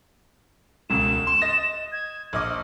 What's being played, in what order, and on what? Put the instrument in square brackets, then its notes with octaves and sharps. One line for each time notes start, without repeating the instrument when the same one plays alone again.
[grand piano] E1 C#2 [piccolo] E7
[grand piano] C6
D#5 A6 A#6
[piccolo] G#6
[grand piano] A#1 D#5 D6 [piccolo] F6